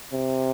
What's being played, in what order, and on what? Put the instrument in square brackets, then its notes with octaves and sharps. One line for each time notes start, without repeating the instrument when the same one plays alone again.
[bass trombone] C3